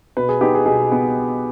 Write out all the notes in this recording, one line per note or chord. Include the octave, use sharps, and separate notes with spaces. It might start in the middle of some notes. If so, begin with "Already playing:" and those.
B2 B4
G#4
B3 D#4 G4
G#4
B2 G#4
B3